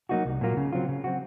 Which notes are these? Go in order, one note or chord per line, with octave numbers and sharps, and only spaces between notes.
F#3 A#3 D#4 F#4
C2
A#2 F#3 A#3 F4
C#3
F#3 C4 F4
C#3
F#3 C4 F#4